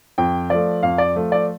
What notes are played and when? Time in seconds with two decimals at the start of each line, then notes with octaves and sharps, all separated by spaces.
0.18 F2 G5
0.50 F3 A3 D5
0.83 F2 F5
0.98 D5
1.15 F3 A3
1.32 D5